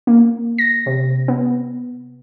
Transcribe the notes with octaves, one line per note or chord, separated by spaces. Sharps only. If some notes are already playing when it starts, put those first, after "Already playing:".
A#3
A#6
C3
B3